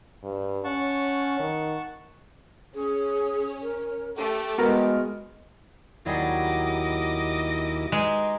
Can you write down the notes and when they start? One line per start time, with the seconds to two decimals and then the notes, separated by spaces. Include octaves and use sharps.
0.23 G2
0.64 C#4 F#5 A5 C#6
1.39 D#3
2.75 C#4 G#4
3.62 A#4
4.15 A3 G4 A4
4.58 G#3 B3 F#4 A#4
6.06 D#2 F#3 G3 E4 G#4 D#5 D6
7.92 G#3 D#4 G#4 B4